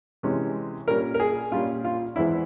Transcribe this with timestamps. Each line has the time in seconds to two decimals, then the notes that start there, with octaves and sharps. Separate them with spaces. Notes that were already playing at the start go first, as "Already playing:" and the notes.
0.23 C3 E3 G#3 C#4
0.88 A#2 G3 C#4 A#4
1.14 A#4
1.20 G#4
1.51 A#2 G3 C#4 F4
1.84 F4
2.16 E2 E3 G#3 C4 E4